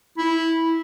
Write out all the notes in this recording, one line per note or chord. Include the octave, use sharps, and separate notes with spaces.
E4